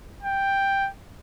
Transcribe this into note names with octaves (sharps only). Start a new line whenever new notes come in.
G5